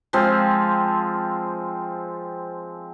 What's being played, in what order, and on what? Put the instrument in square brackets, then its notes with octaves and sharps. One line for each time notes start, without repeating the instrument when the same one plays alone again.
[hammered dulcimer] F3 G#3 C4 F5